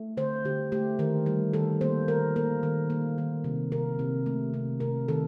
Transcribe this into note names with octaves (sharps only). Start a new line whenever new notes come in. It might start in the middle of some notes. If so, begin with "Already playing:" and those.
Already playing: A3
D3 C5
D3 G4
A3 G4
D#3 A#4
G3
D#3 A4
A#3 C5
D#3 A#4
A#3 A#4
D#3
A#3
D#3
C3
C3 A#4
C3
A3
C3
C3 A#4
D#3 A4